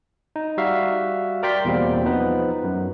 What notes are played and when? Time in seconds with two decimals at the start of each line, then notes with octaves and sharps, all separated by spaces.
0.36 D#4
0.57 G3 F#4 E5 F5
1.43 A#4 D5 G5 C6 B6
1.65 E2 B2 G3 A#3 C4
2.05 F3 B3 D#4 B4
2.64 F#2